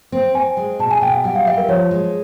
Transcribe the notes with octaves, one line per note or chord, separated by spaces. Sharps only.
C4
C4 G#5
G#3
B2 A5
G#5
B2 G5
F#5
G3 F#5
F5
G3 E5
A#4
F3 C#5
G#3